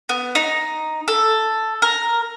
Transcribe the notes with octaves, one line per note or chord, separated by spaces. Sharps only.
B3
D#4
A4
A#4